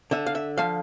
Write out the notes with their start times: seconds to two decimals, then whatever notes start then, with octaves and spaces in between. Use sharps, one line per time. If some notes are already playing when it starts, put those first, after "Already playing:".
0.11 D3 E5
0.26 F5
0.35 E5
0.58 F3 F5